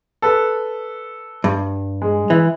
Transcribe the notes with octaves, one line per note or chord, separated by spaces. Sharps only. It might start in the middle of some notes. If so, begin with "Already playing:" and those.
A4 B4
G2
G#3
E3